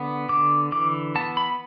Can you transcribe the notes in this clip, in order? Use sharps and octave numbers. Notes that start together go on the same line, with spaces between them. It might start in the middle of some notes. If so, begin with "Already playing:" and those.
Already playing: D3 B3
D3 D6
E3 D6
B3 A5
B5